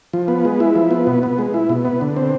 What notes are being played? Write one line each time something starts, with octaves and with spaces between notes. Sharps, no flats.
F3
B3
G#3
E4
F3
B3
B2
B3
G#3
E4
B2
B3
D3
C4